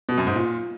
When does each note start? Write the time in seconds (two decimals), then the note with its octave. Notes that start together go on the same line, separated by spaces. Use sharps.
0.09 B2
0.18 F#2
0.27 G#2
0.36 A#2